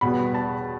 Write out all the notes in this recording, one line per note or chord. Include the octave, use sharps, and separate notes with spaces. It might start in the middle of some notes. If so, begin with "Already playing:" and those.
E2 B2 G3 B3 B5
A5